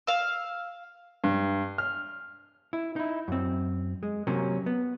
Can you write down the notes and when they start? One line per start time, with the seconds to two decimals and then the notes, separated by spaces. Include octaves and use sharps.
0.07 F5 E6
1.24 G2
1.78 F6
2.73 E4
2.96 D#4 E4
3.28 F#2 C4
4.03 G#3
4.27 C3 F#3 A#3 C#4
4.66 B3